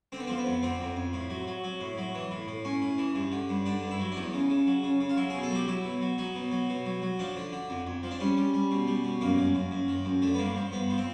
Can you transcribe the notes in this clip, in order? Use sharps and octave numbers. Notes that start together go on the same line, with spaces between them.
D3 C4
B3
F3 C4
B3
F2
D3 C4
F2
F2
A2
F#3
F#3
F#3
A2
F#3
E3
A2
A2
A2 C#4
A2
E3
G2
D3
G2
D3 D4
G2
E4
F#3
D4
E2 D#4
C#3
C#3
F#3
C#3
C#3
F4
F#3 E4
B2 G#4
A4
F#3 G4
F#3 E4
B2
F#3
F#3 D#4
B2
F#3
B2
F#3
F#3
F3 D4
D3
D3
F2
F2
F3
D4
G3 C#4
G3
G3
B2
G3
B2
F#2 A#3
F#2
F#2
F#2
D#3
F#2
D3 A3
B3
G2 A#3
F3
G2 B3
F3
C4